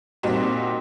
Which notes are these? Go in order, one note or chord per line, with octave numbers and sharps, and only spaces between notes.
A#2 G3 C4 D#4 F#4